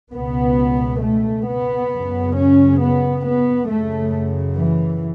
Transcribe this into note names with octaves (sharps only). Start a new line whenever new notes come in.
C#2 B2 B3
A3
B3
F#2 C#3
C#4
B3
B3
F#2 C#3 A3
E3